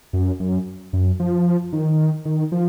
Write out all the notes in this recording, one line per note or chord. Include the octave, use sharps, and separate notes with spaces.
F#2
F#2
F#2
F3
D#3
D#3
F3